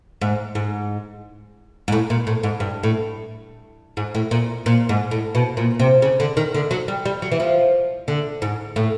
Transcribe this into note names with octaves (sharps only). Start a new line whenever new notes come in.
G#2
G#2
G#2
A2
A#2
A2
G#2
G2
A2
G#2
A2
A#2
A#2
G#2
A2
B2
A#2
C3
C#3
D3
D#3
D3
F#3
G3
G3
F#3
E3
F3
D3
G#2
A2